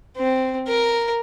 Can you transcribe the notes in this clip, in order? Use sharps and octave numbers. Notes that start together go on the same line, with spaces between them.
C4
A#4